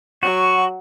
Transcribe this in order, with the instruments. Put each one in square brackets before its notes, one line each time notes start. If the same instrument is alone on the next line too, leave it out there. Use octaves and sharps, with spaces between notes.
[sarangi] F#3 [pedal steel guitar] F#4 [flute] C#6